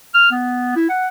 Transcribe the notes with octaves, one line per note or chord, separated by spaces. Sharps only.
F6
B3
E4
F#5